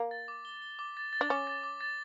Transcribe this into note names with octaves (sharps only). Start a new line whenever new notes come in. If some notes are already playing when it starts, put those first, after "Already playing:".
Already playing: A#3
A6
D6
G7
G7
D6
A6
A6
D4
C#4 D6
A6
D6
A6